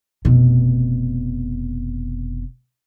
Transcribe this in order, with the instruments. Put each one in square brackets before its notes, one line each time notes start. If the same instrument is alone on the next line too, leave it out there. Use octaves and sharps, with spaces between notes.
[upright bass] F1 B2